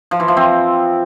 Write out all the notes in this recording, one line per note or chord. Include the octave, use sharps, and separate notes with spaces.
F3
E3
F3
C4